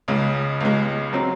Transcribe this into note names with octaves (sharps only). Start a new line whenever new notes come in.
C#2 C#3 G#3
C#2 C#3 G#3
F#3 C4